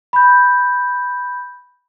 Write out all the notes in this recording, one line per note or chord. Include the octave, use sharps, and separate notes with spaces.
B5 G6